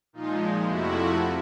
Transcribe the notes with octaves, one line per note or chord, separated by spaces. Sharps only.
A#2 F3 G#3 D#4 F4
F2 C3 F3 A3 E4 F#4